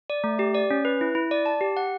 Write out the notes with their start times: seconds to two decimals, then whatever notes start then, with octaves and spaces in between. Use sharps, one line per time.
0.10 D5
0.24 A3
0.39 G4
0.55 D5
0.71 C#4
0.85 B4
1.01 E4
1.15 E4
1.31 D5
1.46 A5
1.61 G4
1.77 F#5